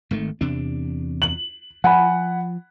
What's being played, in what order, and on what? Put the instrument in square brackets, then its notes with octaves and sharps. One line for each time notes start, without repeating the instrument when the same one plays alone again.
[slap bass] G#1 D#3 A3
E2 C3 D4
[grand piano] F#7
[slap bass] F3 [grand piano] F#5 G#5 B5